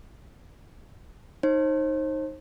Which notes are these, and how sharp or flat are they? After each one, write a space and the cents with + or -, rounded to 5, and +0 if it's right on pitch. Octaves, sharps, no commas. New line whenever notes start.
D#4 +0 C5 +35